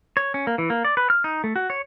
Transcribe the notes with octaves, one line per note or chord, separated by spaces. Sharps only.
C#5
C#4
A#3
E3
A#3
D5
B4
F6
D#4
A3
F#4
C#5